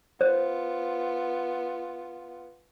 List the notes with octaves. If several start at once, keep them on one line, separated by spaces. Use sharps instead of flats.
B3 F4 C5